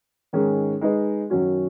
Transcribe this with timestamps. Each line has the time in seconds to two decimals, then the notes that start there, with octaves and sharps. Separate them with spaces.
0.33 G#2 D#3 G#3 C#4 G#4
0.81 G#3 D#4 G#4 B4 D#5
1.30 F#2 D#3 F#3 C#4 F#4